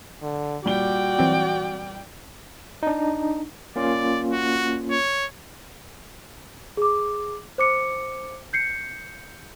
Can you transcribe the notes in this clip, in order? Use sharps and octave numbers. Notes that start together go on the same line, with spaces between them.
D3
A#2 G3 F#4 D5 G5 G7
E3 F#3 C4
D4 D#4
A#3 C#4 F4 D5
F#4
C#5
G#4 D6
C5 D6 C#7
G6 C7 C#7